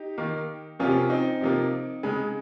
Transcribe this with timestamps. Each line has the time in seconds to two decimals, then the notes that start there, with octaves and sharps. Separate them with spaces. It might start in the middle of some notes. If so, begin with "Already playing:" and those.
Already playing: D#4 G4
0.18 D#3 A#3
0.79 C3 F3 A#3 C#4 F4
1.10 C4 D#4
1.41 C3 F3 A#3
2.03 C#3 G#3